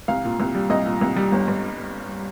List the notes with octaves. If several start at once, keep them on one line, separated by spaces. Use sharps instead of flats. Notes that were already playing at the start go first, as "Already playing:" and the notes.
C2 F5
A#2
C2
G3
C2 D#5
A#2
C2
G3
G1
G2